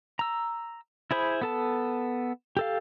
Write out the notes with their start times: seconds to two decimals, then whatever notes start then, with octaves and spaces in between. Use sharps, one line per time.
0.19 A#5 E6
1.11 E4 G#4 C5 B5
1.41 B3 A4 A5
2.57 G4 A4 F5